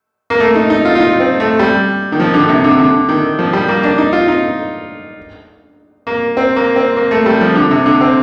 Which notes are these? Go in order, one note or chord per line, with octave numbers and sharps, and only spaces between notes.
A#3
A3
D#4
D#4
F4
F4
D#4
C4
A3
G3
D#3
F3
D3
C3
D3
D3
D#3
F3
G3
A#3
D4
D#4
F4
D#4
A#3
C4
A#3
C4
A#3
A3
G3
F3
D3
C3
D3
C4